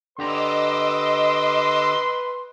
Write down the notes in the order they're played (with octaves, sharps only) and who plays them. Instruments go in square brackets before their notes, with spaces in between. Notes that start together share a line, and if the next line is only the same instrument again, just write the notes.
[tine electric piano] D3 G4 A#5 [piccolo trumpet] B4 [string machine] D#5 D6 E6 [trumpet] C6